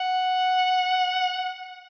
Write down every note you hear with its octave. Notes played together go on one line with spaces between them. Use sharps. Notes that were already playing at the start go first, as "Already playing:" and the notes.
Already playing: F#5